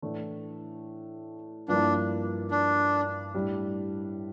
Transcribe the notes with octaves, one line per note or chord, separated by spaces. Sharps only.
A2 E3 A3 D4
G2 F3 A#3 D4 E4
D4
A2 G3 D4